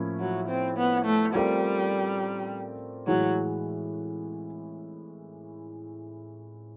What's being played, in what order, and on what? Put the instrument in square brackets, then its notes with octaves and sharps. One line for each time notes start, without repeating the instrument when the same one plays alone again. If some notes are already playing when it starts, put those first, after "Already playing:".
Already playing: [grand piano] A2 F3 A#3 C#4 E4
[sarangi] F#3
C4
B3
A3
[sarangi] G3 [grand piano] A3 C4 F4 A#4 D5
[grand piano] A2 E3 G#3 [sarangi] F#3